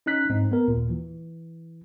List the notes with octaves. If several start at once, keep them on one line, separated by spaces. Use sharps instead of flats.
C#4 D#4 F#6 B6
G#2 C4 D#4
B3 A#4
D#2 A#2
E3